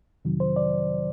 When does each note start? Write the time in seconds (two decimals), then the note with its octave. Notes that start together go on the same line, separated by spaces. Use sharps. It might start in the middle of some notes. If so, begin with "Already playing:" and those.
0.25 F2 C3 D#3 F#3
0.40 C5
0.56 D5